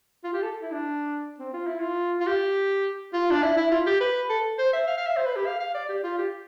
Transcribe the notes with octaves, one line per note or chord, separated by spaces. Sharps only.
F4
G4
A4
E4
D4
C4
F4
E4
F4
F4
G4
F4
D4
E4
E4
F4
G4
B4
A4
C5
E5
F5
F5
E5
C5
B4
G4
F5
F5
D5
G4
F4
G4